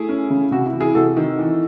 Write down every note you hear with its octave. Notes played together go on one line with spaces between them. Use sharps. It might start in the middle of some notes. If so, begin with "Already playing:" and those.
Already playing: A3 E4 G#4
C#4
C#3
C3 F#4
E4
E3
E4 G#4
C3 F#4 A4
D#3
E3